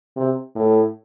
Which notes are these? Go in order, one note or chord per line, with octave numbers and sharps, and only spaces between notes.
C3
A2